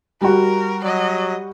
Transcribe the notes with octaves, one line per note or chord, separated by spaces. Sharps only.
G3 F#4 A#4
F#3 D#5